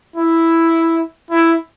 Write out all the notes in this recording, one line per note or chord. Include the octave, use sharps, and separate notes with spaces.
E4
E4